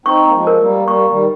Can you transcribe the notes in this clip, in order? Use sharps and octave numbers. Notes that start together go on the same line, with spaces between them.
C4 D#4 C#6
A#3
F3 G#3
A#4
G3 A#3
G3 A#3 C#6
D#3 G3